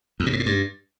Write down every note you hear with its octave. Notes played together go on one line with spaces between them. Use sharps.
E2
A#2
G#2
A2
G2